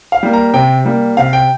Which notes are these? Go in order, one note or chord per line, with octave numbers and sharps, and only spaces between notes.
F5
G3 A#3
A#5
C3 G5
G3 A#3
C3 F5
G5